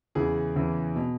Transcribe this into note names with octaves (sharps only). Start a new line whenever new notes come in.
E2 C#3 E3 G#4
E2 C#3 E3
B2